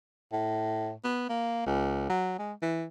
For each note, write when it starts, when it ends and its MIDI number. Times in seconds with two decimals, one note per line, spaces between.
0.33 0.93 45
1.04 1.29 59
1.29 1.64 58
1.66 2.05 37
2.10 2.38 54
2.39 2.53 56
2.62 2.85 52